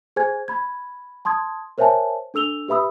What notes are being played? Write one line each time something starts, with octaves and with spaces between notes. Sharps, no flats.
G#4 C5 G#5 G#6
B5 G#6
A5 C6 D#6 G#6
A#4 C5 C#5 E5 G#5 A5
D4 A4 E6 F7 G7
G4 B4 E5 B5 D#6 E6